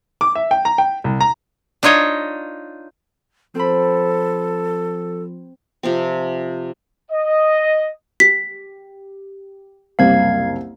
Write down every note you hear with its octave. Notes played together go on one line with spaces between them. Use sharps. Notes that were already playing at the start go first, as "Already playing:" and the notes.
D6
E5
G5
A#5
G5
C2
A#5
D4 D#4 F4 C#5 D#5
F3 C4 A4 B5
C3 F3 C4
D#5
G4 B6
F#1 C2 C5 F5 G#6